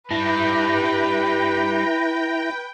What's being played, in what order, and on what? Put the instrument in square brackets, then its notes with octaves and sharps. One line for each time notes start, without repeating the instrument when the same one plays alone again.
[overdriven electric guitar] G3 D4 [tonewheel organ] E4 A#5 [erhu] B4 [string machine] G5